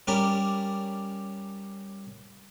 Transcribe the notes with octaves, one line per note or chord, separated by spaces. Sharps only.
G3 C#4 A#4 D5 B5